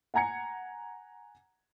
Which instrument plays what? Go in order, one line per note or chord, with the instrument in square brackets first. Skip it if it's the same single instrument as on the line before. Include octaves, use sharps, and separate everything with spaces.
[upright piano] F#5 G#5 A#5 G#6 C#7